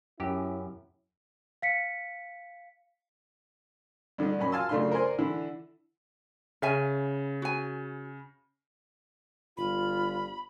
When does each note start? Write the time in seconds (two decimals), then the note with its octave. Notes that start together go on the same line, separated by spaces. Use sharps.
0.20 F#2 C#4 E4 G4
1.62 F5 B6 C#7
4.18 G2 D3 D4 D#4
4.39 F#2 F#3 C#4 B5
4.52 F5 G#5 A5 C6 E6
4.69 F#2 C#3 A3 D4 F4 C6
4.92 A#4 C5 D5 G#5 C6
5.19 D3 E3 E4
6.62 C#3 C#4 E5 G#5
7.42 F#4 G#5
9.57 G1 F4 B5